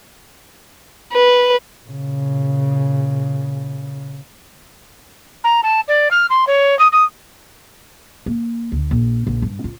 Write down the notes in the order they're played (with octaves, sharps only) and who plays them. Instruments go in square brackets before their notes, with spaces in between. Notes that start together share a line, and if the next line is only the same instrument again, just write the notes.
[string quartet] B4
[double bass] A#2 C#3
[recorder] A#5
A5
D5
F6
C6
C#5
D#6
D#6
[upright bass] A#3
D2
A#1
A#1
G2
F4